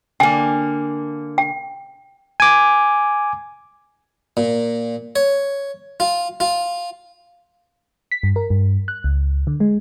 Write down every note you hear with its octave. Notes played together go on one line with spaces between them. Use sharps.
D3 A#3 G5 G#5
G5
G#5 D6
A#2
C#5
F4
F4
B6
G2
A#4
G2
F#6
C#2
D3
G#3